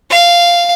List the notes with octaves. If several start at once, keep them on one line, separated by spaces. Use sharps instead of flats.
F5